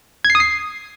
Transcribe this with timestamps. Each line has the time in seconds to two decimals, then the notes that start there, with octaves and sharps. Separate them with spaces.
0.25 G#6
0.30 C7
0.35 D#6
0.40 C7